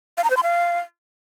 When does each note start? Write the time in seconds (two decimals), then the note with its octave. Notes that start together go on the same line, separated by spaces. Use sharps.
0.18 F5
0.24 A#5
0.30 C5
0.37 C6
0.43 F5